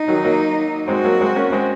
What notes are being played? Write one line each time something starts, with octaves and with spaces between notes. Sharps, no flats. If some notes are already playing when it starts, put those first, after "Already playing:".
Already playing: D#4
D#3 F#3
F#3 A#3
G#3 C4 F#4
F#3 A#3
G#3 C4
A#3 C#4
G#3 C4